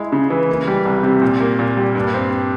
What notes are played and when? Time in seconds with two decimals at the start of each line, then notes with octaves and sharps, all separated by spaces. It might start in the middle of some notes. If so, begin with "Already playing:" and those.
Already playing: G#3 E4
0.12 C#3
0.30 E3
0.49 A#3
0.68 G3
0.85 C2
1.03 C3
1.22 A#2
1.40 A#3
1.59 A#2
1.77 G3
1.95 G2
2.14 C4